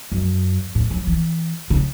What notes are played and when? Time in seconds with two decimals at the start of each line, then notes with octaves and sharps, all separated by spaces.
0.12 F#2
0.75 A2
0.91 F#3
1.07 E3
1.70 C#3